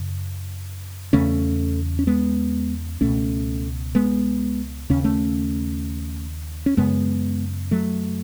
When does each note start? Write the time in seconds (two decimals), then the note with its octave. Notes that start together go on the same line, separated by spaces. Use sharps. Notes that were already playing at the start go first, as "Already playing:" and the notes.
Already playing: F#2 C#3
1.13 E2 C#3 A3 C#4
1.99 C#4
2.07 G#3 B3
3.01 C#2 B2 A3 C#4
3.95 G#3 B3
4.90 D#2 C#3 C#4
5.04 A3 C#4
6.66 C#4
6.77 F#2 C#3 G#3 B3
7.71 F#3 A3